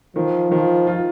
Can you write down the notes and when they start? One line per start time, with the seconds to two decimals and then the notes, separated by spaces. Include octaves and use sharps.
0.16 D#3 F3
0.51 D#3 F3
0.87 F4